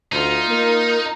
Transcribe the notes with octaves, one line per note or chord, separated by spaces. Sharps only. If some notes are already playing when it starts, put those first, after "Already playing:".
D2 D#4 F4
A#3 A#4